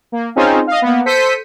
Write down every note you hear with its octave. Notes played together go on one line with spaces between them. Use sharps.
A#3
C4 C#4 D#4 F4 G#4 C5
D#5 F5
A#3 B3
A4 C5 G6 B6 C#7 D#7